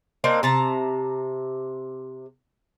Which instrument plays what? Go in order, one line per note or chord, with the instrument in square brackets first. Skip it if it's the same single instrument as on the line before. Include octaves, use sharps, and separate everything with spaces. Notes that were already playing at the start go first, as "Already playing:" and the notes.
[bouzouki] A#3 C4 D4 D#4
C3 A5 A#5